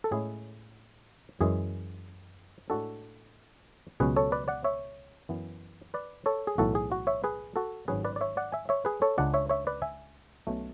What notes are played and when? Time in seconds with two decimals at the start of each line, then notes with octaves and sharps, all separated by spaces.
0.04 A4
0.11 A2 G#3 C#4 E4 G#4
1.41 F#2 E3 G#3 G#4
2.70 A2 G#3 D4 F#4 A4
4.00 C#2 B2 F#3 C#4 G#4 B4
4.16 A4 C#5
4.32 B4 D5
4.48 D5 F#5
4.64 C#5 E5
5.29 F#2 E3 B3
5.94 B4 D5
6.26 A4 C#5
6.47 G#4
6.58 B1 A2 E3 F#4 A4
6.75 G#4
6.92 F#4
7.07 C#5 E5
7.24 G#4 B4
7.56 F#4 A4
7.88 G#1 G#2 F#3 C#4 G#4 B4
8.05 B4 D5
8.16 D5
8.21 C#5 E5
8.37 D5 F#5
8.52 E5 G#5
8.69 C#5 E5
8.85 G#4 B4
9.02 A4 C#5
9.18 C#2 C#3 G#3 D4 D5 F#5
9.34 C#5 E5
9.50 C#5 E5
9.67 B4 D5
9.82 E5 G#5
10.47 B1 B2 A3 C#4